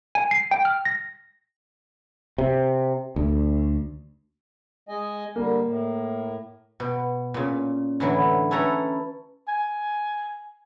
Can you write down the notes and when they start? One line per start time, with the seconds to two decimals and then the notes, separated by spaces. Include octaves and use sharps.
0.15 G#5
0.31 C7
0.51 G5
0.65 F6
0.85 A#6
2.38 C3
3.16 D2
4.89 G#3 D#5 G#5
5.36 D3 G3 A#3
5.65 A2
6.80 B2
7.34 A#2 C#3
8.00 A2 D3 E3 F#3 E4
8.51 C#4 E4 A4 B4 C#5 A#5
9.48 G#5